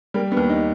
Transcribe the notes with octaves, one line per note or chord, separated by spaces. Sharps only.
G3 A#3
B3
D#2
D#4